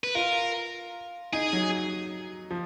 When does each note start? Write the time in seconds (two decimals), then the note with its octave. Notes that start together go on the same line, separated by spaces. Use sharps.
0.04 B4
0.15 F4 A#4
1.33 D#4 G#4
1.53 F#3
2.51 F3